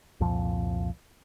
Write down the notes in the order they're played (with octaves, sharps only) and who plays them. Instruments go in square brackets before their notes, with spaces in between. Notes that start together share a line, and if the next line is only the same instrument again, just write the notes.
[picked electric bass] C2 F2 A#2 F3